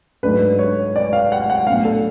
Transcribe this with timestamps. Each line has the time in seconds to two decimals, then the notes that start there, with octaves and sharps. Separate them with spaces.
0.23 G#2 F#3 A3 D4 B4
0.59 C#5
0.96 D5
1.13 F5
1.32 F#5
1.50 F#5
1.67 A2 F#3 B3 D4 F5
1.85 A4